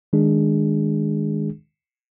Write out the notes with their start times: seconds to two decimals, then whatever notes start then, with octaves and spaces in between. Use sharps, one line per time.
0.13 D#3 G#3 D4 G#4